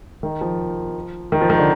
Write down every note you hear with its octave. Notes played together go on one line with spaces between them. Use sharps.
D#3
F3
D#3
F3
D#3
D3